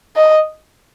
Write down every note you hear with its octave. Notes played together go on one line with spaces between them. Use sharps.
D#5